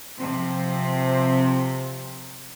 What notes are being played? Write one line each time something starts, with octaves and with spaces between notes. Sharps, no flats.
C3 F3 C4